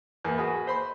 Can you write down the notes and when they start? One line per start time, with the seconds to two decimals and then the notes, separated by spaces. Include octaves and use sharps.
0.24 E2 A#3
0.38 F#4 G#4 B4
0.66 B4 C5 B5 C6